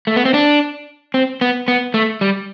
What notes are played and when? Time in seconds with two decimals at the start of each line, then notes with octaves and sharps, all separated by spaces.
0.07 A3
0.16 B3
0.25 C4
0.34 D4
1.14 C4
1.41 B3
1.68 B3
1.94 A3
2.21 G3